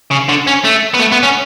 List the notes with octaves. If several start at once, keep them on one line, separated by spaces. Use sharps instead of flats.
C#3
D3
C#4
A3
B3
A3
B3
C#4